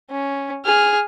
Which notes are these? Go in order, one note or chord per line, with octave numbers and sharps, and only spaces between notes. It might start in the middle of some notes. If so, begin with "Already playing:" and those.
C#4
G#4 F6